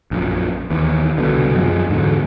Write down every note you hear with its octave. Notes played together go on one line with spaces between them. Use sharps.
A#1 F#2 A#2
D#2 E3
C2 B2 D3
F#2 F3 G#3
E2 G#2 D3 F#3